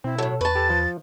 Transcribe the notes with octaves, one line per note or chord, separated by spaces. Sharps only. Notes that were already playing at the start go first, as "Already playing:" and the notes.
B2 C4 E4
A2 F#3 A4
E2 B4 A5 C#6
G4 A4 A6
F3